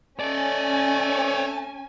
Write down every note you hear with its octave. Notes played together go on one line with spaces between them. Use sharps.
A3 C#4 C#5 D5 G#5 A5